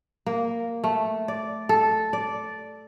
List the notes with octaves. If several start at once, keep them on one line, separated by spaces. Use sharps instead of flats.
A#3
A3
D5
A4
D5